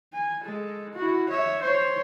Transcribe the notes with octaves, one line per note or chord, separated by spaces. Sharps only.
G#5
G#3 A4
E4 F#4
C#5 E5
C5 C#5